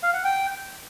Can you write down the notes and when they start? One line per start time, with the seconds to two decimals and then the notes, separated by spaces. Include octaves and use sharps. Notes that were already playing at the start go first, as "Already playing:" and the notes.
0.03 F5
0.14 F#5
0.24 G5